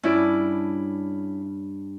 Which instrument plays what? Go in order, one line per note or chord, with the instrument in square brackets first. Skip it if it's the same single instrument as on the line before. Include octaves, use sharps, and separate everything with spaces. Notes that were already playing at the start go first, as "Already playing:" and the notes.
[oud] G2 [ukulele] C#4 E4 D5